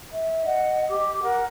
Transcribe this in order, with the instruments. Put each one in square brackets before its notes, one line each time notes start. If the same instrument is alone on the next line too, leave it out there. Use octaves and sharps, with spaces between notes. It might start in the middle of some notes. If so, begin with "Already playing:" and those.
[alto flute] E5
[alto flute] D#5 [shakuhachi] F#5
[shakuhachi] G4
[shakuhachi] A#4 [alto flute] F#5